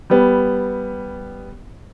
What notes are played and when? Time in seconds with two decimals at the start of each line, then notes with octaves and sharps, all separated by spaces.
0.10 G3 B3